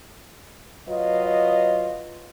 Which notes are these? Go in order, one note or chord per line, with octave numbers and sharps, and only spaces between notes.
F#3 F4 B4 D#5